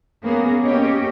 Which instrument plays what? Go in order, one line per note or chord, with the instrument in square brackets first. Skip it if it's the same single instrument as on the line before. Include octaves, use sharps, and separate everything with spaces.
[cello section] A#3 B3 C#4 G#4
A#3 C#4 G4 C#5 D#5